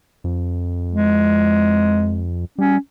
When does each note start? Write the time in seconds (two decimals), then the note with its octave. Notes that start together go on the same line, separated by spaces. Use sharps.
0.24 F2
0.92 G#3
2.58 G3 C#4